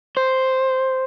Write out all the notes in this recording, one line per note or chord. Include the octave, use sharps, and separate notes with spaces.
C5